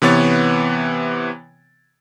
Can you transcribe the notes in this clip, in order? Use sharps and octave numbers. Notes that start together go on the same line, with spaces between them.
C3 E3 B3 C#5 A6